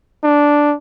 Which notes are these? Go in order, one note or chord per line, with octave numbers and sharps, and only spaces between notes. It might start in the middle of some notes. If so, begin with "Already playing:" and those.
D4